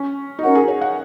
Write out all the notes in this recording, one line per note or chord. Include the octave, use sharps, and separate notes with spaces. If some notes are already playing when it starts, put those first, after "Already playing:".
Already playing: C#4
D#4
C#4 F#4 A#4 C#5 F#5
G#4
C#5
F#5